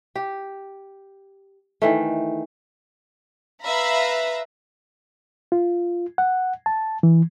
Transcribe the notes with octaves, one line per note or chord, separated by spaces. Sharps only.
G4
D#3 E3 A3
B4 E5 F5 A#5 B5
F4
F#5
A5
E3